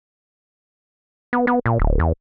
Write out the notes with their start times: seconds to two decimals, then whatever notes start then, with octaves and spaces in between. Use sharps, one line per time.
1.33 B3
1.47 B3
1.66 A#2
1.80 D1
1.99 E2